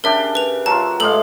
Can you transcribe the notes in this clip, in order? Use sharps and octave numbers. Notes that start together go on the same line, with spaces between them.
C#3 D4 G4 A#4 E5
B4 F7
F#3 F4 A5
A2 G#3 A4 F5 F#7